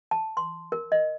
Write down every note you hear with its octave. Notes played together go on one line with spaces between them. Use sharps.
A5
C6
A#4
D#5